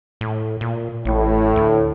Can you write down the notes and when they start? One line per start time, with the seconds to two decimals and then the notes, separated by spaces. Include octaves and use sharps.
0.21 A2
0.61 A#2
1.05 A1 A2
1.56 D2